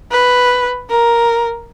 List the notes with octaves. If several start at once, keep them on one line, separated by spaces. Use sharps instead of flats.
B4
A#4